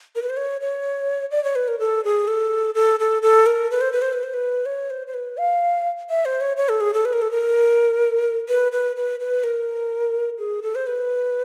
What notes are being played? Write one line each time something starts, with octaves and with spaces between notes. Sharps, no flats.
A#4
B4
C5
C#5
C#5
D5
C#5
B4
A#4
A4
G#4
A4
A4
A4
A4
A#4
B4
C5
B4
C5
B4
C5
B4
C#5
C5
C5
B4
F5
E5
C5
C#5
C#5
A4
G#4
A4
B4
A#4
A4
A#4
B4
B4
B4
B4
A#4
G#4
A4
C5
B4